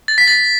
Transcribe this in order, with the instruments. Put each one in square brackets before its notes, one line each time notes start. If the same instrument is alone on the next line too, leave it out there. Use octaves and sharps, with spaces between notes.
[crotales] A6
B6
A6